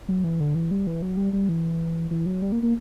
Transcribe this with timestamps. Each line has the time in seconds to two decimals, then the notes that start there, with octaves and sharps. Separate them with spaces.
0.08 F#3
0.24 E3
0.40 D3
0.55 E3
0.71 G3
0.87 E3
1.02 F#3
1.17 G3
1.33 G3
1.49 E3
2.11 E3
2.26 F#3
2.42 G3
2.52 A#3
2.63 A#3